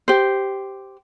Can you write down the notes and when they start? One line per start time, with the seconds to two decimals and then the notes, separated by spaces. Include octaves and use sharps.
0.08 G4 C5